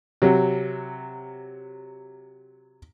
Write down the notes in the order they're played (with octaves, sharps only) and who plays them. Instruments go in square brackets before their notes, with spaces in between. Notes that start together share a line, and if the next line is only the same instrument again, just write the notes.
[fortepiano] C3 F#3